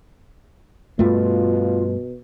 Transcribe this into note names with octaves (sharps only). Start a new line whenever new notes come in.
G2 B2 A3 F4